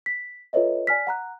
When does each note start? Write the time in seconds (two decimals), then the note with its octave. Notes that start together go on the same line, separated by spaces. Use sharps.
0.06 B6
0.53 F4 A4 B4 C#5 D#5 E5
0.87 D5 G#5 F6 B6
1.07 F#5 A#5 F#6